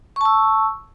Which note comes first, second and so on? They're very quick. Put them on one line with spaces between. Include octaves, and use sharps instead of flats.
C#6 A5 E6